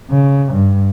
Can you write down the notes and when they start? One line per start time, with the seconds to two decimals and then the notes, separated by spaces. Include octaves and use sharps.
0.11 C#3
0.53 G2